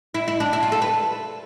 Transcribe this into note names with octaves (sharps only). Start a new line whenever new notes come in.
E4
E4
D4
E4
F4
A4
B4